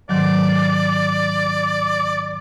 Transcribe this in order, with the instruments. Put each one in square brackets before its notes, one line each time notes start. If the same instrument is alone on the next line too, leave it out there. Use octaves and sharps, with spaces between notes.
[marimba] G#2 D#3 F#3 [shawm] D5